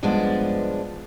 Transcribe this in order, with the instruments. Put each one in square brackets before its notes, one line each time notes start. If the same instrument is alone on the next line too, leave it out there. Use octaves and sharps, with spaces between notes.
[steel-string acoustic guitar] G2 F3 G#3 B3 D4